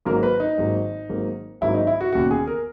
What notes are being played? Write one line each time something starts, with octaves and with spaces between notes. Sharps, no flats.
G#1 G#2 F#3 A#3 A#4
B4
D#4
G#1 G#2 F#3 A#3
G#1 G#2 F#3 A#3
G#1 G#2 F#3 A#3 E4
D#4
E4
F#4
E1 D#2 C#3 F#4
G#4
A#4